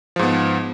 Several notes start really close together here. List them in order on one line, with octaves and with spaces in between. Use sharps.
F3 G#2 B3